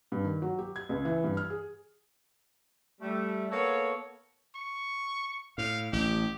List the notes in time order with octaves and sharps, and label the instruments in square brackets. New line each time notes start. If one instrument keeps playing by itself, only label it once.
[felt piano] G2
D#3
F#3
G4
G#6
C#2
E3
G2
F6
G#4
[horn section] G3 A3
A#3 B3 A4 C#5
[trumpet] C#6
[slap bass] A2 [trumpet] F5
[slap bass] A1 [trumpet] G4